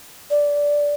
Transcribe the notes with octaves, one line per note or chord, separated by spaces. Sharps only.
D5